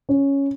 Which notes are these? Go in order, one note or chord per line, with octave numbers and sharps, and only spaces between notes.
C#4